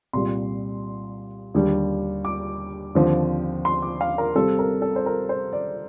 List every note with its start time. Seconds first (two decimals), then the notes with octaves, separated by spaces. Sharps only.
0.13 C2 A#2 G3 C6
1.54 D#2 D3 G3 D4
2.25 D6
2.95 D#2 D3 F3 C4
3.65 C6
3.82 D6
4.01 F5
4.18 A#4
4.35 C3 G3 C4 A4
4.59 A#4
4.82 A4
4.96 C5
5.06 A#4
5.29 C5
5.53 D5